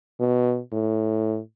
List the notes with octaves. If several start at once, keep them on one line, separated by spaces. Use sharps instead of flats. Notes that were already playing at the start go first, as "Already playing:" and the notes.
B2
A2